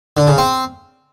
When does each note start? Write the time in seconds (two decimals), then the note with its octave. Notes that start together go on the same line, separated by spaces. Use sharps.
0.17 D3
0.27 C#3
0.38 C4